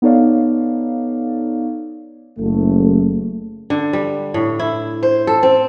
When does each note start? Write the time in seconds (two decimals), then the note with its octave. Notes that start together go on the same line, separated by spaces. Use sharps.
0.02 B3 D#4 A4 C#5 D5 F5
2.39 F#1 A3
3.70 D3
3.93 G3
4.34 A2
4.59 E4
5.03 C5
5.27 A4
5.43 C4